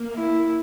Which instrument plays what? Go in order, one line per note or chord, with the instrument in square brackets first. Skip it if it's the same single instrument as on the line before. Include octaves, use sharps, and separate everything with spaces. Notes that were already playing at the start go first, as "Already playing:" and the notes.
Already playing: [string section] A#3
[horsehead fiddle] E4